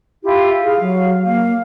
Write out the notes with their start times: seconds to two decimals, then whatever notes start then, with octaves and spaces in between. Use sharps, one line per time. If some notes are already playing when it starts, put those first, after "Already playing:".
0.23 E4 F4 G4
0.63 G#4 F5
0.80 F#3
1.25 A#3 F5